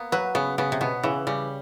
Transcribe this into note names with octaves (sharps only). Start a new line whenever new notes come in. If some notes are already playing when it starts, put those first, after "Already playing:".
Already playing: A#3 B3
F#3 B4
C#3 B3
C#3 B3
C3
B2 B3
C#3 E3
C#3 G3